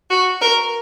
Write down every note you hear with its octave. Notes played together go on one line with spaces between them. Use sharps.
F#4
A#4